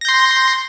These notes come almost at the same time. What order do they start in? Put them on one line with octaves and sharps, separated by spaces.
A#6 G6 C6